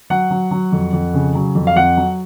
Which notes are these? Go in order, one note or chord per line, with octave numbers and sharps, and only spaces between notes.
F#3 F#5
F#3
F#3
F2
F2
C#3
F#3
F2
F5
F2 F#5
F#3